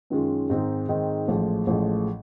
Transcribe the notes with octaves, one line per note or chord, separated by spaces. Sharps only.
F#2 D#3 G#3 C#4 F4
G#2 D#3 G#3 C4 D#4
G#2 D#3 G#3 C4 D#4
A1 A2 F3 G#3
A1 A2 F3 G#3